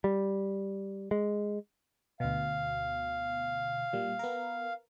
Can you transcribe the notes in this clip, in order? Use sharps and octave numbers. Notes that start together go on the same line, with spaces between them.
G3
G#3
D2 B2 F5
A#2 G3
B3 A#4